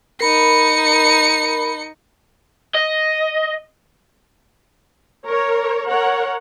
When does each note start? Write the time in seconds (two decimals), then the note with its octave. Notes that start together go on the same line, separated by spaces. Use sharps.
0.21 D#4 A#4 B5 C#7
2.75 D#5
5.26 A#4 C#5
5.89 A#4 C#5 F#5